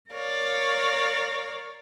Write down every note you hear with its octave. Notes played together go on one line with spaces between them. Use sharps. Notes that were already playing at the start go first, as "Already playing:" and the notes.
A#4 C#5 D5 F5